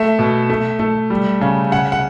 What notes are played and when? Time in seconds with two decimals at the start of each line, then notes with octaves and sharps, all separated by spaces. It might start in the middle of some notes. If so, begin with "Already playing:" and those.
Already playing: A3 E5
0.19 B2
0.50 A3
0.79 A3
1.10 G3
1.41 C#3
1.71 C#3 F#5
1.92 F#5